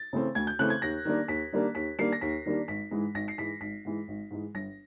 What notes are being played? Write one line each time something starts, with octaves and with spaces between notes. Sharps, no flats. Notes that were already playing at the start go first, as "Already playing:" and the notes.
Already playing: A6
C#3 E3 A3 C4
D2 G#6
G6
C#3 E3 A3 C4 F#6
G#6
D#2 A#6
D#3 G3 A#3 D4
D#2 B6
D#3 G3 A#3 D4
D#2 B6
D#3 G3 A#3 D4 C7
A#6
D#2 B6
D#3 G3 A#3 D4
G#1 B6
G#2 E3 G#3
G#1 A#6
C7
G#2 E3 G#3 B6
G#1 B6
G#2 E3 G#3
G#1
G#2 E3 G#3
G1 A#6